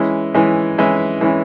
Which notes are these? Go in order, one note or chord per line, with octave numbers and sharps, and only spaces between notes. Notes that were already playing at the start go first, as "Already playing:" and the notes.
Already playing: E3 G#3 C#4 E4
E3 G#3 C#4 E4
E3 G#3 C#4 E4
E3 G#3 C#4 E4